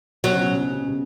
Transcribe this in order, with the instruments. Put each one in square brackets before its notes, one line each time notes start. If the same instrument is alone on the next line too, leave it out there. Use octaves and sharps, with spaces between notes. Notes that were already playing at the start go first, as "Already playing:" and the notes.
[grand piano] B2 [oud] F#3
[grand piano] C#3
B2
C#3
B2
C#3
B2
C#3